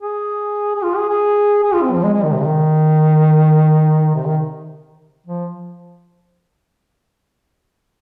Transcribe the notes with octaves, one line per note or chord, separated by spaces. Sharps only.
G#4
G#4
F4
G#4
G#4
G#4
F4
C4
F3
G#3
G#3
D#3
C3
D#3
C3
D#3
F3